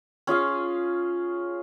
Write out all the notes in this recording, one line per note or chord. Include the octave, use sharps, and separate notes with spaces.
C#4 F4 G#4 F5